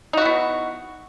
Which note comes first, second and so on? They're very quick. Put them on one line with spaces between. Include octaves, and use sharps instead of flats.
D#4 F#4 E4 B3